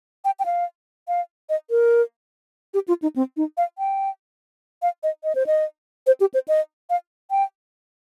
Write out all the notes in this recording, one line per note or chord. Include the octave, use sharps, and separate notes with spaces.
G5
G5
F5
F5
D#5
A#4
G4
F4
D#4
C4
D#4
F5
G5
F5
D#5
D#5
C5
D#5
C5
G4
C5
D#5
F5
G5